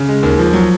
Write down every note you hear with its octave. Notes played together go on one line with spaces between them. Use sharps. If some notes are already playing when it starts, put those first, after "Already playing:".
Already playing: C#3
G#3
D#2
F3
F#3